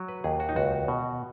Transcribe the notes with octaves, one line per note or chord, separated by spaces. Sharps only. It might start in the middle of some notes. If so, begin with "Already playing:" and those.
Already playing: F#3
B4
D#2 G#4
F#4
D#4
C#2 F#4
B2